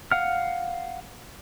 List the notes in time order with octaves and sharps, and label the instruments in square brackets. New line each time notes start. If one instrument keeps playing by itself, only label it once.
[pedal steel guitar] F5 F#5 F6